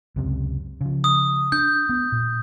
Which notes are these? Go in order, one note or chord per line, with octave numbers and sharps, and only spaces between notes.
C#2 F#2 C3
C#3 F3
D#6
D4 G6
B3
A#2